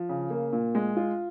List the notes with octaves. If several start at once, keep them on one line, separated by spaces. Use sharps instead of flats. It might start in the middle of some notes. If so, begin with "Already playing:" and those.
Already playing: F3
C#3
A#3
A#2
G#3
F4